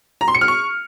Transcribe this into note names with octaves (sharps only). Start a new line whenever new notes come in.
A#5
C6
C#7
F6
C#6